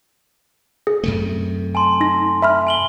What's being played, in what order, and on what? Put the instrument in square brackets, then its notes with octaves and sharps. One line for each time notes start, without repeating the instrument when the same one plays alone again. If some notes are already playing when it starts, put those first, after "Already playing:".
[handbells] G#4
[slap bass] F#2 C3 A3
[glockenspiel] G#5 A5 C6
[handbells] D#4 A#6
E5 B5 F6
[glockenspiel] G#5 F#7 G7